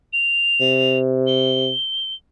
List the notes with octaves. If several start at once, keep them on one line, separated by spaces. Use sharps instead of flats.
F7
C3
G7